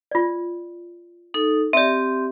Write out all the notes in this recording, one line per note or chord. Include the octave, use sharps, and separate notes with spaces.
F4 D5
D#4 A4
C4 G4 D5 E5